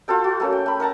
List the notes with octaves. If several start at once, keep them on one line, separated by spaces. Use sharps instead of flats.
F4 F#4 A4 G5
F#4
A3 A#3 C#4
G5
A3 B5
A#4 F#5 A5 A#5